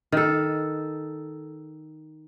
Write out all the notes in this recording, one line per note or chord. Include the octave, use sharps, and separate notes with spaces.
D#3 A4